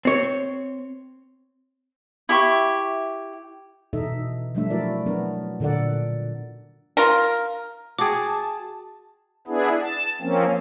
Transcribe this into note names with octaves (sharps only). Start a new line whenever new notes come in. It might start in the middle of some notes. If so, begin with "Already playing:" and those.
C4 C#5
E4 G4 E5 C#6
B2 E3 D#4 A4 D#5 E5
F3 G3 A3 D4 E5
F#3 A3 E4 F#4 A#4 D5
F#3 B3 D4 A#4
A#2 D3 A4 A#4 D5 F#5
F4 A#4
F#4 G#4 G5 A5 D6
B3 D4 E4 G#4
A5
F3 A#3 C4 C#4